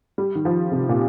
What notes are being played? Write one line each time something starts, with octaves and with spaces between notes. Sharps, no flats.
G3
D#3
F3
C3
A#2